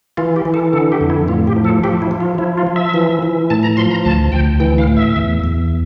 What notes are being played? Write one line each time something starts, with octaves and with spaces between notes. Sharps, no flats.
E3 F4
G4
E3
A4
D3 A4
G4
F2
E4
A2 F4
G4
F3
A4
F3 G4
E4
F3
F4
F3 E4
F4
F3
E5
E3
E3
A2 A5
A#5
F3 C6
A#5
D2 A5
D2 G5
E3 G5
F5
A2
E5
E2
E2